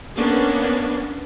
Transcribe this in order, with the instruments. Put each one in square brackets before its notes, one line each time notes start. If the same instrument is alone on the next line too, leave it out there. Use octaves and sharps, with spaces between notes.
[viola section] A#3 B3 C#4 D4